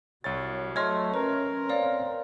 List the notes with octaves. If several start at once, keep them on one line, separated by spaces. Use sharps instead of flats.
C2 F#3 C#5 A6
A3 C#5 D#5 C6 F6 G#6
C#4 A#4 B4
C4 C#5 D5 F5